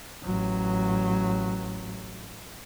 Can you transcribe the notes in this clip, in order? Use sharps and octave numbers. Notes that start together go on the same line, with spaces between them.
A1 F#3